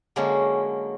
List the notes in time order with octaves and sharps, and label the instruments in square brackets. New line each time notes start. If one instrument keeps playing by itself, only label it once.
[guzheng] D3 F#3 G#3 A#3 C#4